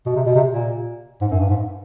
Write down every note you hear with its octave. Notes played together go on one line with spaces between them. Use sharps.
B2
C3
B2
C3
A#2
G#2
F#2
G2
G#2